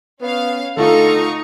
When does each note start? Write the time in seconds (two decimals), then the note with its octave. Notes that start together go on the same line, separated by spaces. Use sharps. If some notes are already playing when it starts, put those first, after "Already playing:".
0.21 B3 C#4 F5
0.77 D3 A3 D#4 F4 A4 F5 A#5 C#6